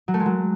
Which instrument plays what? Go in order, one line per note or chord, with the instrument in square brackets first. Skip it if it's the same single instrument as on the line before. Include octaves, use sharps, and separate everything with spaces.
[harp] F#3
A3
G#3
F#3